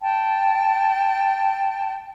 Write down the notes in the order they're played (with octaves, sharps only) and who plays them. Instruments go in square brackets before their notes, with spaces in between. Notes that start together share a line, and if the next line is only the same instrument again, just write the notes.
[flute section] G5 A5